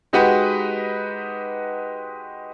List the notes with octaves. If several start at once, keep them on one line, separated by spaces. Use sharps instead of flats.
G#3 D#4 F#4 G4 B4 F#5